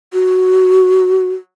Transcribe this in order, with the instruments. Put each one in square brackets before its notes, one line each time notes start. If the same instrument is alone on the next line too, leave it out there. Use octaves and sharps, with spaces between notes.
[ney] F#4